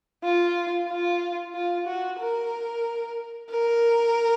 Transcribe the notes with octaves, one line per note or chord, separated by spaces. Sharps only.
F4
F4
F4
F#4
A#4
A#4